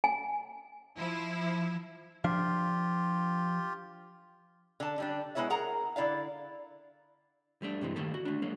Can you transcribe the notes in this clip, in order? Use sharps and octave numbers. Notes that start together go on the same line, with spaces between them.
G#5
F3 E4
F3 D4 F4 G4 F5
D3 A5
D3 G3 D4
G#3 A#3 B3 E4 C#5 E5
G#4 A#4 F#5 A#5
D3 E4 D5 F5
G3 A3 D4
G2 C3 E3 G#3
D#3 A3 A#3 G4 A4
F#4
A3 D4
F#3 G#3 A#3